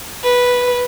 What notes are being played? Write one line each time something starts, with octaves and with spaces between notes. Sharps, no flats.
B4